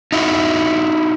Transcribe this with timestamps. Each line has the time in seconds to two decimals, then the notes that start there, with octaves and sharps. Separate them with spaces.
0.12 D#4 E4 F#4